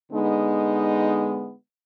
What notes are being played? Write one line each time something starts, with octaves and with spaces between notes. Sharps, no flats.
D3 G#3 B3 D#4